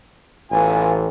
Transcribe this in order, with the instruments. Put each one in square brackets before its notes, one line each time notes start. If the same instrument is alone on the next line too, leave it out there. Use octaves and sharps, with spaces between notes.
[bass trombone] A1 [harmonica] B3 F4 G#5